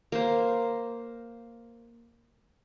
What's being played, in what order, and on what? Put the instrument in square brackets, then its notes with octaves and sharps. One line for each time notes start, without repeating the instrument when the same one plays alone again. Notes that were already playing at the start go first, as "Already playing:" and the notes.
[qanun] A#3 C5